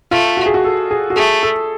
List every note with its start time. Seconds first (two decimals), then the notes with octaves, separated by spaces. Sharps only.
0.11 A3 F4
0.37 F#4
0.46 G#4
0.54 F#4
0.64 A4
0.91 G#4
1.10 F#4
1.16 A3 G#4
1.43 A4